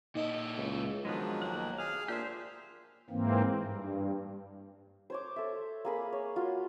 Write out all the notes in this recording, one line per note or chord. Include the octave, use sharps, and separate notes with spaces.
A#2 D#4 E4 D#5
C#2
G#2 D#3 F3 F#3 G#3 B3 D4
B1 A#3 F#5
G#4 F5 G#5
A#2 D4 G4 C5 E5
G#2 E3 A#3 C4
G2
C5 C#5 D6
A4 E5
A#3 G#4 B5
C#5
F4 F#4